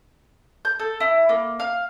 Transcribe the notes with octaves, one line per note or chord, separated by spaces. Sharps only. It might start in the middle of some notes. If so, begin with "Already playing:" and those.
G6
A4
E4
A#3
F5